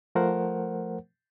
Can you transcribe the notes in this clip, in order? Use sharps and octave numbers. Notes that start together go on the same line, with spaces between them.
F3 A3 A#4 C5 F#5